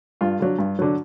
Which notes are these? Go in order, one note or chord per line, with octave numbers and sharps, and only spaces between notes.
G2 F4
D3 F#3
G2
D3 F#3